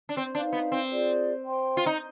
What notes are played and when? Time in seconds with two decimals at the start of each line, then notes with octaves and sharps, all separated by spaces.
0.09 D4
0.17 C4
0.35 D4 D#4 B4 F5
0.53 B3
0.72 C4
0.89 F4 G#4 D5
1.43 C5 G5 C6
1.77 F4
1.86 D#4